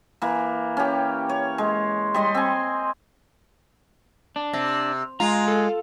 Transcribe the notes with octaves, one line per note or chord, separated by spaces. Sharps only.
E3 A#3
C#4 G4
C#5
G#3
G3 D#5 C6
C4 G#5
D4
C3
G#3 F4 A#5
A4